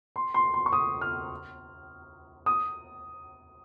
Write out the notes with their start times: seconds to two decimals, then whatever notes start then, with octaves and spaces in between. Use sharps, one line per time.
0.16 C6
0.34 C6
0.54 C6
0.66 C#6
0.73 D#6
1.01 F6
2.46 D#6